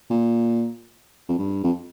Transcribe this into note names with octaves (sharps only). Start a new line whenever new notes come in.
A#2
F2
G2
F2